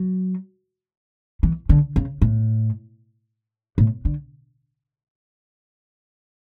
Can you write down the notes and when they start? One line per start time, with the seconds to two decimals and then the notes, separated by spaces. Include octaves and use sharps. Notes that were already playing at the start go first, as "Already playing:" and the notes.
Already playing: F#3
1.43 E3
1.69 D3
1.96 C#3
2.22 A2
3.78 A2
4.05 D3